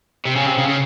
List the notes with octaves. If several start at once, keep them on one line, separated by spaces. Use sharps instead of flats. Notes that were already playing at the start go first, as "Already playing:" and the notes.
C3
C#3
C3
C#3
C#3